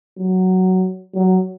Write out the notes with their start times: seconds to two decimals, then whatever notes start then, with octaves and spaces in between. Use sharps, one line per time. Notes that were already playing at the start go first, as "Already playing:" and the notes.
0.18 F#3
1.14 F#3